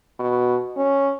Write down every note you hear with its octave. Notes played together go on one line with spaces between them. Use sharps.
B2
C#4